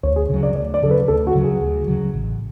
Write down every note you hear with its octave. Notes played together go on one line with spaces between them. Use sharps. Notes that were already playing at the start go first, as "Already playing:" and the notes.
D2 C#5
G#4
C#3 F#3
D5
D2 D5
D5
C#3 F#3 A4
B4
D2 A4
F#4
C#3 F#3
G#4
D2
C#3 F#3
A1